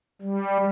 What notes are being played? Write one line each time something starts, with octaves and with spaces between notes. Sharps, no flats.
G3